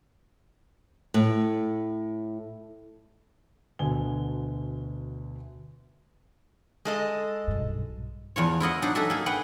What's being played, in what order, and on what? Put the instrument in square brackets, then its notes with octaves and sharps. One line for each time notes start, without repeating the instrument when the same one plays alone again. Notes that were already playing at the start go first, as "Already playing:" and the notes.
[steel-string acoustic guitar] A2
[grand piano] D2 B2 D3 G#5 G7
[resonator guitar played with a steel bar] G#3 A4 D#5
[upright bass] B1 G2
[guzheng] E2 F3 C#5
E4 F4 D#5 F#5
F#3 D4 D#4
D#4 G#4 A4 E5
A#3 G#4
G#4 B4 F#5 G5